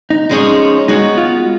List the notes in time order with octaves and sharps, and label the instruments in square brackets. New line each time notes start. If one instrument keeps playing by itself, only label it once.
[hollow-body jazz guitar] D#4
[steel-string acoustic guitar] F3 G#3 C#4 G#4 C#5 [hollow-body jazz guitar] D#4
[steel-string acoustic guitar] G#3 B3 F#4 [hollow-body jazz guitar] D#4
[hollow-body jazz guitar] F4